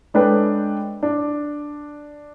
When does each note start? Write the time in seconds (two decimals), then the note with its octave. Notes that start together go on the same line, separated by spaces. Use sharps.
0.14 G#3 D4 A4 B4 C#5 G5
1.03 D4